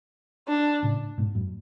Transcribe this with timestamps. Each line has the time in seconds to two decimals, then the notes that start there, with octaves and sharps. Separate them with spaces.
0.48 D4
0.83 A2 C#3
1.18 G#2 B2
1.35 F#2 A2